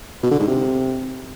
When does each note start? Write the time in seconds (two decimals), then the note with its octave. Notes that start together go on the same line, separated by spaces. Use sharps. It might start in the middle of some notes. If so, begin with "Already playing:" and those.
0.23 B2
0.31 D3
0.39 G#2
0.48 C3